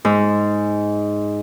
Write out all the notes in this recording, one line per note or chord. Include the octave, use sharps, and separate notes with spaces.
G#2